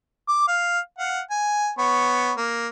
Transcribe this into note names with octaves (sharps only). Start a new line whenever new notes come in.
D6
F5
F5 F#5
G#5
B3 C#5
A#3